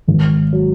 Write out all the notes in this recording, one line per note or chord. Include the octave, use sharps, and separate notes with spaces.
G#1
F#3